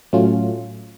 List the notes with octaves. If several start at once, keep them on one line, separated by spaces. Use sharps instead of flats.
A2 F#3 A3 C#4 F4